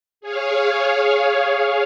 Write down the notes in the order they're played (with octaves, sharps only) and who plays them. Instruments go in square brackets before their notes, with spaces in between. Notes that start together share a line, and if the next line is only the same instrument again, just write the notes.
[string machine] G#4 C#5 F5